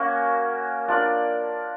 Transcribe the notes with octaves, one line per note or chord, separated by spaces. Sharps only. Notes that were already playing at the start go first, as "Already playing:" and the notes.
Already playing: A#3 C#4 F#4 A#4
D4 F4 A#4 D5